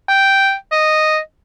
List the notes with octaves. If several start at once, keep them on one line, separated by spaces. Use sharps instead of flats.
G5
D#5